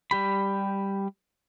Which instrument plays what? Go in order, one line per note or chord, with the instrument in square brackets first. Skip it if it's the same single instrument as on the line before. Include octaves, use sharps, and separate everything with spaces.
[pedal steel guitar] G3 G4 B5